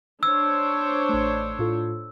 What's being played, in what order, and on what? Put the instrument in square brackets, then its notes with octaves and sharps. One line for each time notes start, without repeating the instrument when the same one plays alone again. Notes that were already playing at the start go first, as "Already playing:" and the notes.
[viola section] D4 C5 C#5 [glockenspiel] E6 [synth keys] G#6
[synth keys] A1 A3
A2 F4 A4